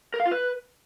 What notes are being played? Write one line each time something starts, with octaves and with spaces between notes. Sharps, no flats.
A#4
F5
F4
B4